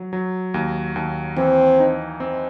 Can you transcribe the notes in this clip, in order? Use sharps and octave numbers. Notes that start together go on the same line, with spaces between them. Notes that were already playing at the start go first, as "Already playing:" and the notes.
Already playing: F#3
F#3
D#2
D#2
E3 C4
D#4
C4